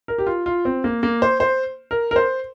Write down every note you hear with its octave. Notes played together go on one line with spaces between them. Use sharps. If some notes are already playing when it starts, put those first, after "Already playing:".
A#4
G4
F4
F4
C4
A#3
A#3
C5
C5
A#4
A#4
C5